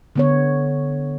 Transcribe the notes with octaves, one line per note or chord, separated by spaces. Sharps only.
D3 B3 C#5